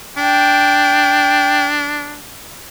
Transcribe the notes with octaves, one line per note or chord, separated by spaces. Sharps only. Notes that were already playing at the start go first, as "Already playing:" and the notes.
D4 G5